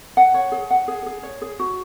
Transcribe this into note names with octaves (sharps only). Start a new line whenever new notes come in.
F#5
C#5
G#4
F#5
G#4
G#4
C#5
G#4
F#4